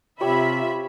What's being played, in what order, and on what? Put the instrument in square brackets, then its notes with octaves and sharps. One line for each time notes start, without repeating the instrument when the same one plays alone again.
[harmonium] C3 [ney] F4 [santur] G4 C#5 [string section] E5 B5